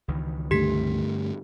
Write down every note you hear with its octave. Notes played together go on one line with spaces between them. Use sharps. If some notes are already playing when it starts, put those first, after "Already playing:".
C#2 D#3 E3
G2 D3 A3 G4 B6